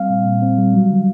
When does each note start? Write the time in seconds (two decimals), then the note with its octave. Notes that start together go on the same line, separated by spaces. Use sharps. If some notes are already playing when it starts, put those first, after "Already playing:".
Already playing: G3 C4 F5
0.10 A#2
0.25 A#2
0.42 C4
0.58 G3
0.74 F#3
0.90 D3